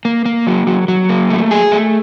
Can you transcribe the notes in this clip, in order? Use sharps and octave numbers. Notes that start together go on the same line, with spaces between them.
A#3
A#3
F#3
F#3
F#3
A#3
A3
G#4
A3